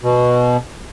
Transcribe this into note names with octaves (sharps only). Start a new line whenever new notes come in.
B2